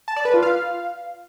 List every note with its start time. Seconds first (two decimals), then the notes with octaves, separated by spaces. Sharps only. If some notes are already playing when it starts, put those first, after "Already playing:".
0.08 A5
0.16 D5
0.25 B4
0.34 F4
0.42 F5